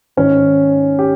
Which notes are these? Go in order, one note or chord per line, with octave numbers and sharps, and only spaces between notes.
G#2 D#3 C#4
G4